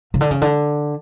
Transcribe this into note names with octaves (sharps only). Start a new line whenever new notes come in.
C#3
D3
C#3
D3